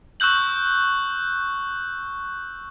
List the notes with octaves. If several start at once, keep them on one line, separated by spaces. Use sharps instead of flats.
C#6 E6 F#6 G6 F#7